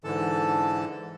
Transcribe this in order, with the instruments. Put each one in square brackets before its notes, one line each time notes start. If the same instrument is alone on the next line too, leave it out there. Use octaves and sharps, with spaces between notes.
[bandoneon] G#2 D3 E3 A4 A5